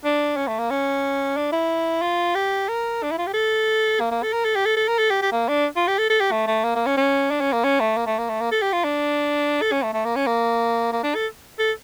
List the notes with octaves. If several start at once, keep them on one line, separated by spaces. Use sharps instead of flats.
D4
C#4
A3
A#3
C#4
D4
E4
F4
G4
A#4
D4
E4
F4
G4
A4
A#3
A#3
A4
A#4
A4
G4
A4
A4
A#4
A4
G4
G4
A#3
D4
F4
G4
A4
A4
G4
A3
A3
A#3
A#3
C#4
C#4
D4
C#4
A#3
C#4
A3
A#3
A3
A#3
A3
A#3
A4
G4
F4
D4
A4
C#4
A3
A3
A#3
C#4
A#3
A#3
D4
A4
A4